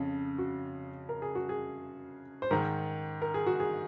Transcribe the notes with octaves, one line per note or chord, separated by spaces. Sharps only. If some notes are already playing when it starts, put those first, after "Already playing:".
Already playing: F2 C#3
F#4
A#4
G#4
F#4
G#4
C5
G#2 D#3 A#4
A#4
G#4
F#4
G#4